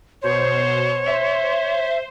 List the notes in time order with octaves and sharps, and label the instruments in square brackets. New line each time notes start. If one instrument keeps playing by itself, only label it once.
[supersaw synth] B2 C5 [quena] C#5
[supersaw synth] C5 [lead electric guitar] E5